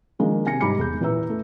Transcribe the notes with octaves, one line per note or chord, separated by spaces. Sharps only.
D#3 F3 G#3 A#3 D4
C3 G#5 A#6 C#7
G#2 G3 A#5 B5 D6 C#7
E1 G#4 G6
A#2 E3 E4 B4 A#5 E6
A3 A4